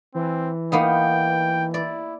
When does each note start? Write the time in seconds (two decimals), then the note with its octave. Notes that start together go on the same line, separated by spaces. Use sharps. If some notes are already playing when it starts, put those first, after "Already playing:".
0.15 E3 C4
0.72 A#3 B3 D#4 G5
1.74 E4 D5